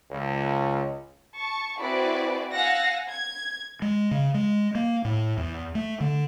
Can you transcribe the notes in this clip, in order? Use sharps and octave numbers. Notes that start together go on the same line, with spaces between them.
C#2
A5 C#6
C4 E4 F#4 G#4 B4 D5
F5 F#5 G#5 E6 A#6
G#6
G#3
C#3
G#3
A#3
A2
E2
A3
D3